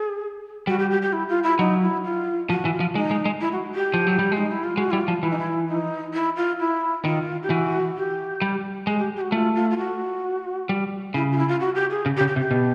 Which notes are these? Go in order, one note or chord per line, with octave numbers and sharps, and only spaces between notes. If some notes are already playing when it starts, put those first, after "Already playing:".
Already playing: G#4
G3 F#4
G4
G4
G4
E4
F4
E4
F#3 D#4
E4
F4
F3 F#4
E3
F4
F3
G#3 D#4
G#3
G#3
E4
F#4
G4
F3
F#3
G3
G#3
D#4
E4
F4
G#3 F#4
G3 E4
F4
F3
E3 E4
D#4
E4
D#4
E4
F4
E4
D#3 F4
G4
E3 F#4
G4
G3
G#3 G#4
G4
G4
F#4
A3 F4
F4
F4
F#4
G3
C#3 E4
F4
E4
F4
F#4
G4
G#4
C#3
G4
C#3
G4
C3
G4
B2